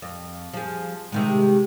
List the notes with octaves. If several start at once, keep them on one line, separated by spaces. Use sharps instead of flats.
F2
F3 G#4
C3 D#3 G#3